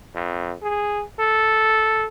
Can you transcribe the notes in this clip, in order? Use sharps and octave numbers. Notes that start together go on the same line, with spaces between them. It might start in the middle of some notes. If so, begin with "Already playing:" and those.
F2
G#4
A4